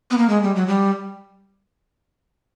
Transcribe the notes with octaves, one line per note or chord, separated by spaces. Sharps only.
B3
A#3
G#3
G3
F#3
G3